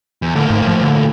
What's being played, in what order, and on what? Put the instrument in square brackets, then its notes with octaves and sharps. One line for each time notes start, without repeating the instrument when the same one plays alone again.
[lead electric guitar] E2
[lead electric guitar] A2 A#3 [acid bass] D3
[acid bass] G#2
F3
D3